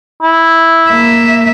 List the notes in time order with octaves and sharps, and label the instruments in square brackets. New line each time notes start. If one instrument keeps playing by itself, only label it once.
[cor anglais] E4
[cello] A#3 E5